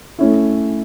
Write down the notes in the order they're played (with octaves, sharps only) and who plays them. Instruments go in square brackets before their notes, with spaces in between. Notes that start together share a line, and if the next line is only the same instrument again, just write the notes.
[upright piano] A3 C#4 E4